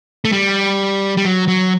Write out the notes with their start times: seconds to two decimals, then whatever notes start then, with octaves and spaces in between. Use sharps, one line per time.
0.25 A3
0.32 G3
1.17 G3
1.25 F#3
1.48 F#3